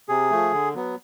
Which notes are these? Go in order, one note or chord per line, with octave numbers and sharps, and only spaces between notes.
C3 G#4
F3 A3
D3
F#3 B3